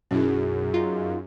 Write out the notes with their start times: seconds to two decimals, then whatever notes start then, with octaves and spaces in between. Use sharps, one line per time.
0.11 B1 F#2 C#4 E4 F#4 G#4
0.74 D#4 F4